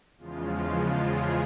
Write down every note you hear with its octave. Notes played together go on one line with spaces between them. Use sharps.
E2 C#3 F3 G#3 F4
F4
G#4